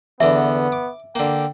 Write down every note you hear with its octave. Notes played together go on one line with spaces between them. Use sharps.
E2 D3 B3 E5
D6
D3 A#3 G5